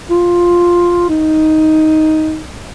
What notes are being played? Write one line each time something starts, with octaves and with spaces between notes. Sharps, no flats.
F4
D#4